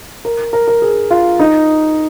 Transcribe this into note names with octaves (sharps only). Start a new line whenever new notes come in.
A#4
A#4
A#4
G#4
F4
D#4